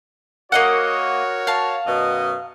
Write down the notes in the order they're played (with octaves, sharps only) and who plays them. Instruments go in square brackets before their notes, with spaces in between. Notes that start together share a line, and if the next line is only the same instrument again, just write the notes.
[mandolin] A#3 D#5 F#5 [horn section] F#4 A#4 C#5
[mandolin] F5 A5
[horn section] F#2 B2 D#5